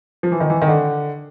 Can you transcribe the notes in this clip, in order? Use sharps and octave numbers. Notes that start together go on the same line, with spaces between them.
F3
E3
D#3
E3
D#3
D3